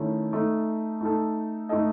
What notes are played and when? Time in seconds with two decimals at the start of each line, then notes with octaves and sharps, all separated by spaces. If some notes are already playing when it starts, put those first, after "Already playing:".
Already playing: D#3 A3 C#4 E4
0.33 A3 D#4 A4
1.01 A3 D#4 A4
1.69 A3 D#4 A4 D#5